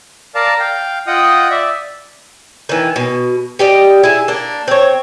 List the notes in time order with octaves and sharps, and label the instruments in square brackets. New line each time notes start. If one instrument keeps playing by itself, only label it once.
[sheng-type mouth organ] A#4 D5 F5 A5 A#5
F5 G5
F4 D#5 F#5 G5 D#6
D5 E5
[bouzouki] D#3 E3
B2
G4 D5 D#5
E4 G#4
A#3 D4
C4 C#5